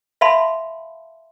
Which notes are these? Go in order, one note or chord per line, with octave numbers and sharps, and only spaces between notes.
E5 F5 A5 B5 C6